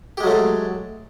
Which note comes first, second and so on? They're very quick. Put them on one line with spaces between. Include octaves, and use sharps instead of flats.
G4 G#3 F#3 A3